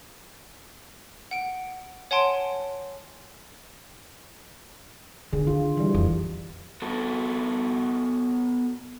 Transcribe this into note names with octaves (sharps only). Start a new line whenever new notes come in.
F#5 D7
C#5 F#5 G#5 A5 C6 D7
D3 D#3 G#4
F4
E3 G3
F2
B3 F#4 A4